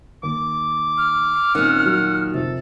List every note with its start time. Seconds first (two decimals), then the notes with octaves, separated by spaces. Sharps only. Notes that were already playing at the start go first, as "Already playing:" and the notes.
0.23 D#2 D6
0.98 F6
1.55 A#2 D#3 C4 C#4 F#5
1.86 F#3
2.34 F2 C3 A4